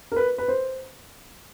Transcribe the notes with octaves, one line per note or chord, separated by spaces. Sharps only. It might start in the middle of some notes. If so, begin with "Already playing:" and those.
A#4
B4
B4
C5